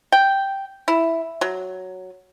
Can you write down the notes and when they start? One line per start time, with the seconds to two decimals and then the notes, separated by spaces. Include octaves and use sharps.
0.12 G5
0.88 E4
1.41 F#3